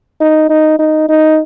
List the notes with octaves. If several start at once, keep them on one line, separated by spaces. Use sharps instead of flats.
D#4
D#4
D#4
D#4